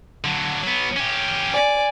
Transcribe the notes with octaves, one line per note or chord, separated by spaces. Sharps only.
D3 F#3
F#3 B3
C#4 G4
D5 G#5